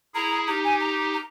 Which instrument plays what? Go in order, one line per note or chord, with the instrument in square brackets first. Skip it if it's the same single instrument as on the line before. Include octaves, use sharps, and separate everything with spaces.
[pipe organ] E4 G#4 [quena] A#5
[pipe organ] D#4 G4 [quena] A#5
[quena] G#5
A#5
A#5